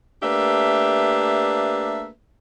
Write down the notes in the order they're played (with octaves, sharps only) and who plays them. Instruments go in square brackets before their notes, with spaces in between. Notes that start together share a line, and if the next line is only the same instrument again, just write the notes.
[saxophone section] A3 A#3 D4 G4 B4 E5